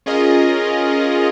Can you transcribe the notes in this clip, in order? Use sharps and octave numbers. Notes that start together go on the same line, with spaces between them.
C#4 F4 G#4 A#4 D#5